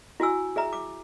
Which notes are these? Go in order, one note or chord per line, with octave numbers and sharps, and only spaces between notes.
E4 F#4 G#5 E6
G#4 E5 A#5
D6